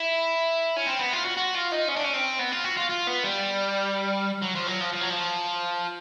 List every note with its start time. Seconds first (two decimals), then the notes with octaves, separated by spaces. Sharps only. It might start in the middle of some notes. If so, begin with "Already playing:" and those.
Already playing: E4
0.76 C#4
0.87 C4
0.99 B3
1.13 F4
1.25 F#4
1.37 F#4
1.55 F4
1.72 D#4
1.88 C#4
1.96 D4
2.04 C#4
2.13 C4
2.39 B3
2.52 F4
2.64 F#4
2.77 F4
2.90 F4
3.07 B3
3.24 G3
4.42 F#3
4.55 F3
4.67 F#3
4.81 F3
4.93 F3
5.01 F#3
5.10 F3